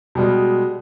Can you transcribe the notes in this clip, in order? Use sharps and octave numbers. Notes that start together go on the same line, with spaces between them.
B2 G3 G#3